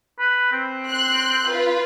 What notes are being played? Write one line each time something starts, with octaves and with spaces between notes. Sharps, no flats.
B4
C4
C6 F#6
F4 B4